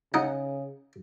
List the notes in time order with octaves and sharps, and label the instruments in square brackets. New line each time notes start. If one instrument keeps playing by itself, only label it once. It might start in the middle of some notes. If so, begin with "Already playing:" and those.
[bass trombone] C#3 [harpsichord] D#4 F#5